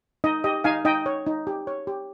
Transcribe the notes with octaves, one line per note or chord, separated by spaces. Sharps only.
D#4 D#5
G4 D#5
D#4 F5 G#5
D#4 D#5 G5
C#5
D#4
G4
C#5
G4